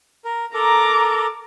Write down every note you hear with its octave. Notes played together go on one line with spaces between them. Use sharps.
A#4
A4 A#4 A#5 D6